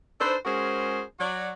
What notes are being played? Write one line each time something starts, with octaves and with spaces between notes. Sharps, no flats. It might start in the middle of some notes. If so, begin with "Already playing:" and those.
D4 D#4 A4 B4 C5
G#3 C#4 F#4 G#4 A#4 C5
F#3 F#4 D5